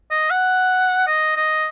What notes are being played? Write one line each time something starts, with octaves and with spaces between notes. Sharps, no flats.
D#5
F#5
D#5
D#5